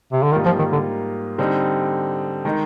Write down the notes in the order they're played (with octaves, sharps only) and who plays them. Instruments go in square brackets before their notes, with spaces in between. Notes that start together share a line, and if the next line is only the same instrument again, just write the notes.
[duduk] C3
D3
[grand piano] G#2 G3 A#3 F4 [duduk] D#3
[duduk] F3
D#3
D3
[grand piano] D3 G3 C4 D#4
D#3 G#3 D#4